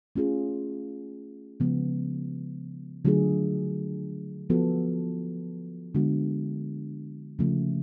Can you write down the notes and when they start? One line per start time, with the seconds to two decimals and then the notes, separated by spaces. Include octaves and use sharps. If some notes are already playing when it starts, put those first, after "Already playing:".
0.16 A3 C#4 F4 G#4
1.60 C#3 F3 G#3 B3
3.05 D3 F#3 A3 F4 G#4
4.50 F3 B3 F#4 A4
5.95 D3 G#3 B3 F#4
7.39 C#3 F3 A3